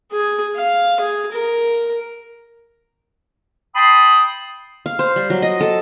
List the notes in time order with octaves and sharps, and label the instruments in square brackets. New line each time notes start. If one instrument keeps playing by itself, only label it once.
[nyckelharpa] G#4
F5
G#4
A#4
[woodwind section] G5 A5 B5 C6 D#6
[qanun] F5
C5
G3
F#3
D#5
A4